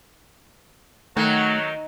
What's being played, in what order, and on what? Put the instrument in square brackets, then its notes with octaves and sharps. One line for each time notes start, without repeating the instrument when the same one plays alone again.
[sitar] D#3 [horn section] F#3 [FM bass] A3